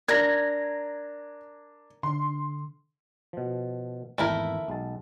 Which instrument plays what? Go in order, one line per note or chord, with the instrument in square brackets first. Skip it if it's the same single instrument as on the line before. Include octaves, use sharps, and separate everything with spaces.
[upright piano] D4 [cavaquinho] A#4 A#5 [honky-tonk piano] G#6 A#6
[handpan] D3 [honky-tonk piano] C6
[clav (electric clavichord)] B2 F3
[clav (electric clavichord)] G#1 E2 A#5 [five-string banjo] A3 E4 A#4
[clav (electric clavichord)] B1 G#3 A5